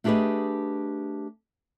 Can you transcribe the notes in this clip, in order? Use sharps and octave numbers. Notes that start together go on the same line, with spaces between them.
A3 D4 G4 G#4 B4 D#5